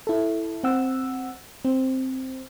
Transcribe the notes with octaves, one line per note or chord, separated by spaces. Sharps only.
E4 A4
C4 F#5 E6
C4